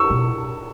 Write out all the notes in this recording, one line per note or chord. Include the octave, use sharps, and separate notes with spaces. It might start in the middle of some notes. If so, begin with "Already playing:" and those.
Already playing: C#6 E6
B2